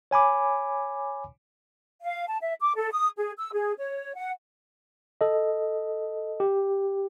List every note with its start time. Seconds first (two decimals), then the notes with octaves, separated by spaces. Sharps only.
0.11 C#5 G#5 B5 D6
2.02 F5
2.28 A5
2.42 E5
2.60 D6
2.76 A4
2.92 D#6
3.17 G#4
3.38 E6
3.52 G#4
3.78 C#5
4.15 F#5
5.21 A4 D#5
6.40 G4